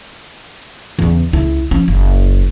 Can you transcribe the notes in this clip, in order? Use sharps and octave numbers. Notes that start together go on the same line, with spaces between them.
E2 C#3
C#2 E4
F3 C#4
F#1